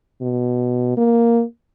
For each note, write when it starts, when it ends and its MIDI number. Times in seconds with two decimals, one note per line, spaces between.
0.22 0.92 47
0.97 1.43 58